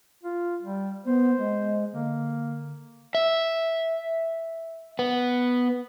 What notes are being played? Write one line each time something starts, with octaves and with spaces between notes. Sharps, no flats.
F4
G3
B3 C5
G#3
D3 A#3
E5
B3